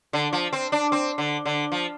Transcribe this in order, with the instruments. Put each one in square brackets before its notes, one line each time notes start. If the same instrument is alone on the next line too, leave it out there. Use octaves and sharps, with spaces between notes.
[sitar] D3
F3
C4
D4
C4
D3
D3
F3